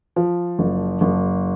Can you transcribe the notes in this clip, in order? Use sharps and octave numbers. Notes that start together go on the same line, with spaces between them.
F3
F#1
F#1